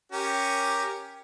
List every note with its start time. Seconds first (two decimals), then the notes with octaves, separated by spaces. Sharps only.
0.12 C#4 G4 A#4